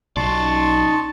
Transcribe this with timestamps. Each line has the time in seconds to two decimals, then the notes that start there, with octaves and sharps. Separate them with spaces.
0.17 B1 D#4 D5 A5 C6 C#6